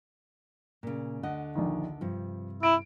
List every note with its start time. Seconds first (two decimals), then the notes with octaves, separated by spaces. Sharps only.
0.83 A#2 C#3
1.23 D2 D3 D#5 F#5
1.55 A#1 D#3
2.01 G2 C3 F3
2.63 E4 D7